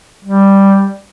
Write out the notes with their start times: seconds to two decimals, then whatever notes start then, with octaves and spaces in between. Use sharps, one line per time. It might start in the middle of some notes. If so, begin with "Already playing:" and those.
0.25 G3